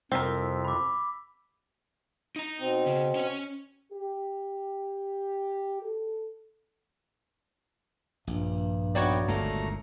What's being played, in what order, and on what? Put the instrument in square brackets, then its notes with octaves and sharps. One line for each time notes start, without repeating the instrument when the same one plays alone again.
[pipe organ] F2 [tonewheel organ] C3 G3 E4 [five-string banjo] C4 A#4 [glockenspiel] E6 B6
[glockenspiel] B5 D6
[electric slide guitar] D#4 A#5
[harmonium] B2 C4
[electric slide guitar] C#3
C#4 C#5
[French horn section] G4
A4
[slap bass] A#1 [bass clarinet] G2
[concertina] B3 D#4 G5 [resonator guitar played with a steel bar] F#4 C#5 D5
[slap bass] G1 C#2 A#2 [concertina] A3 A#5